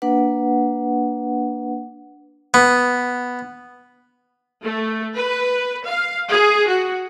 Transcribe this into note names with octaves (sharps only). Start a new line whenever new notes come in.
A#3 D4 B4 F#5
B3
A3
B4
F5
G#4
F#4